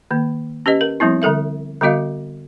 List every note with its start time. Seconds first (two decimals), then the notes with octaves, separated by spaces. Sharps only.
0.11 D#3 A#3
0.66 C#4 G4 B4 D#5
0.81 A#4
1.00 F3 G3 B3 C4 E4
1.22 D3 G3 A4 A#4 E5
1.81 D3 G3 B3 F#4 D#5 F5